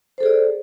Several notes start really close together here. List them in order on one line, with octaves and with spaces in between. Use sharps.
C5 A4 G#4 D5